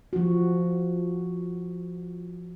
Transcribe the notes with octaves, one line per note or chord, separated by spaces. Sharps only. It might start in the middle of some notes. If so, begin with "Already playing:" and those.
F3 F#4